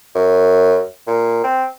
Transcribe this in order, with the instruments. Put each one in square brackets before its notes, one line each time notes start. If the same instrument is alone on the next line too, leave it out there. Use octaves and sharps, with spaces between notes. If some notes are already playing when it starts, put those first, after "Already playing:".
[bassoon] F#2
A#2
C4